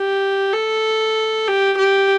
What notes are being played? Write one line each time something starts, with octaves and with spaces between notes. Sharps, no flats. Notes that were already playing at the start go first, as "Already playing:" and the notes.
Already playing: G4
A4
G4
G4